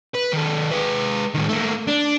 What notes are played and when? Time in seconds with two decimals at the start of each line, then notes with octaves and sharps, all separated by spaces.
0.15 B4
0.33 D#3 A4
0.71 G#3 B4
1.34 A2 D#3
1.49 A3 A#3
1.88 D4